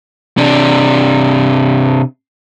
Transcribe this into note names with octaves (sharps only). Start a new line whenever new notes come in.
C3 D4